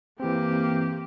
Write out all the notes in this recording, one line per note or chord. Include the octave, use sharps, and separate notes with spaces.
E3 A#3 C4 G4